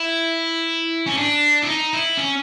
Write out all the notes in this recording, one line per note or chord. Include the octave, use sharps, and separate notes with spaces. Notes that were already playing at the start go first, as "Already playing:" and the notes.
Already playing: E4
C#4
D4
E4
D#4
E4
C#4